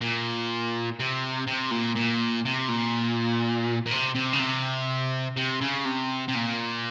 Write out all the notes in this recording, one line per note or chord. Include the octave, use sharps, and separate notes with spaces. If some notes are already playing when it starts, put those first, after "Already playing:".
A#2
C3
C3
A#2
A#2
C3
A#2
A#2
C3
C3
C#3
C3
C3
C#3
C3
C3
A#2